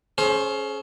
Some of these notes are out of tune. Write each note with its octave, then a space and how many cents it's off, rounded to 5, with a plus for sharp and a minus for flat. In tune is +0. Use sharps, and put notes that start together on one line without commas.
C#4 +0 G#4 +35 C5 +20